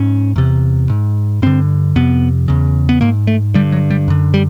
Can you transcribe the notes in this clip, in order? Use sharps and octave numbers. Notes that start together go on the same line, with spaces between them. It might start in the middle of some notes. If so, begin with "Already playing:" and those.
Already playing: G#2 C#4
E2 C3
G#2
G2 D3 C4
F2 C3 B3
E2 C#3
B3
G#2 A#3
A3
G2 D3 G3
F#3
G3
F#2 D3
G3